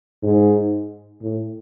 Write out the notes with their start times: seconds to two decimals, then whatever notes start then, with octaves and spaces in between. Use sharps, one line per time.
0.23 G#2
1.22 A2